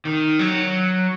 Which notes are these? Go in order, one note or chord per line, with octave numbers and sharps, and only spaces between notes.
D#3
F#3